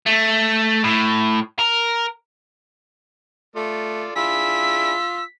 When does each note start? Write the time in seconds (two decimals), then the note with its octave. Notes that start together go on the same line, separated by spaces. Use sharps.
0.07 A3
0.84 A2
1.59 A#4
3.56 A3 F4 A4 D5
4.16 D4 E4 F4 G#4 E6 B6